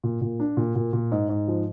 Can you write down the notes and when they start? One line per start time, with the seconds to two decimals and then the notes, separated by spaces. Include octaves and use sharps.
0.04 A#2
0.21 A#2
0.40 D4
0.57 A#2
0.76 A#2
0.93 A#2
1.12 G#2
1.29 G#2
1.48 F3